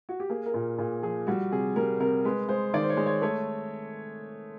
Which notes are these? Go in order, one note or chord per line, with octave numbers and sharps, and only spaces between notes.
F#4
G4
A#3 G#4
A#4
A#2
A#2 G#4
F3 G#4
G3 F#4
C3 G#4
G3 A#4
C3 A#4
G#3 B4
G#3 C5
D#3 D5
C5
C#5
G#3
C#5
A3 C#5